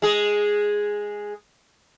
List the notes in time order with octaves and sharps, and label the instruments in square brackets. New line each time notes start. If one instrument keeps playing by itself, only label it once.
[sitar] G#3 G#4